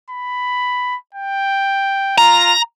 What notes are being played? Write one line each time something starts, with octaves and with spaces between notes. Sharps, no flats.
B5
G5
F4 A#5